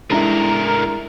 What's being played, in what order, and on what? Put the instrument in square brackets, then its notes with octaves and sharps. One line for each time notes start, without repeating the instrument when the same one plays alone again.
[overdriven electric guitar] A2 A#4 [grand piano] G#3 D4 E4